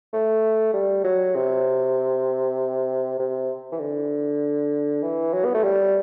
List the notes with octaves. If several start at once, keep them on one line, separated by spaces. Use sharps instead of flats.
A3
G3
F#3
C3
C3
E3
D3
E3
F#3
B3
A3
G3